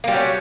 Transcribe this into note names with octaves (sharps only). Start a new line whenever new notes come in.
G3 A#3 C#4 F#4